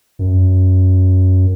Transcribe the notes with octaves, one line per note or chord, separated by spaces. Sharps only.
F#2